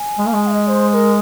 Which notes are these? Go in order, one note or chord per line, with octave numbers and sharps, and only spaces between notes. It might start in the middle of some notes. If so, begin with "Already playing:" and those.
Already playing: G#5
G#3
A#3
G#3
F5
D#5
C5
C5
A#4